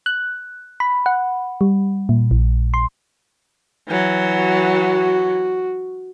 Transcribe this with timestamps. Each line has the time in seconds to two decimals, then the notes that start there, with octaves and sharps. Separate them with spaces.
0.06 F#6
0.80 B5
1.06 F#5
1.61 G3
2.09 A#2
2.31 A#1
2.74 C6
3.88 E3 F#3
4.35 F#4